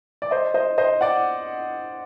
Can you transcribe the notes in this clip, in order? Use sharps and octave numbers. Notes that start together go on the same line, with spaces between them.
D5
C5 D#5
C5 D#5
C5 D#5
D5 F#5